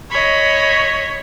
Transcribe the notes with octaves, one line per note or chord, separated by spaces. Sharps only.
C#5 D#5 B5